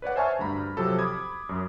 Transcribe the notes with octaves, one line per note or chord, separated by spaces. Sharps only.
B4 C#5 D5 F#5
C5 E5 G#5 A5 C#6 F6
D2 G2 A#5 B5
C3 F3 F#3 G4 A4
B5 D6 D#6 G#6
F#2